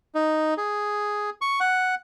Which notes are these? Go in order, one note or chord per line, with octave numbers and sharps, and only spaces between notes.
D#4
G#4
C#6
F#5